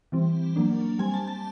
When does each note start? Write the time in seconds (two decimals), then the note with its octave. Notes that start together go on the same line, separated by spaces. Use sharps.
0.12 E3 G3 C4
0.56 F#3 A#3 D4
0.99 G3 C4 G#5
1.14 A5
1.27 A5